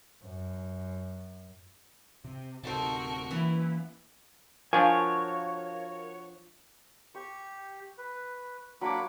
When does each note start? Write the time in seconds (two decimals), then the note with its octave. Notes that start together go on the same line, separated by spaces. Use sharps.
0.23 F#2
2.25 C3
2.63 D1 C3 D#4 F#4 A4 A#4 C5 A5
3.31 E3 A#3 C#4 E4 B4
4.73 F3 D4 F#4 A#4 C#5 F5 G#5 C#6
7.15 G4 C#6
7.98 B4
8.81 F#3 A#3 D4 C#5 B5 D6